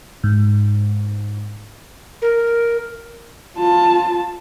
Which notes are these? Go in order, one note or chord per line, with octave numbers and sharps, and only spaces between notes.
G#2
A#4
F4 A5